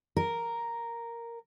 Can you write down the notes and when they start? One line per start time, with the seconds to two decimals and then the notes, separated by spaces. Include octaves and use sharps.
0.16 A#4